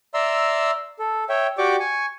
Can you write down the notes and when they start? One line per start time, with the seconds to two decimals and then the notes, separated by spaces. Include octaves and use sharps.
0.14 D5 E5 A#5 C6 E6
0.99 A4
1.29 C#5 E5 G5
1.58 F#4 G4 D5 G5 C#6 D6
1.80 G#5 C#6